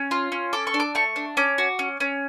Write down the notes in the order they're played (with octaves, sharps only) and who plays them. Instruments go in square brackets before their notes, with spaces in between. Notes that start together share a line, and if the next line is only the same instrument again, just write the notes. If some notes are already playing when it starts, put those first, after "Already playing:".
Already playing: [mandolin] C#4
F4
C#4
A4 D6
C#6
D4
D6
A3 C#6
D4
C#4 D6
F#4
C#4
C#4